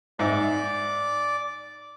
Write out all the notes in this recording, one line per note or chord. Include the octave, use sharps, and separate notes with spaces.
G#2 D5 E5 D6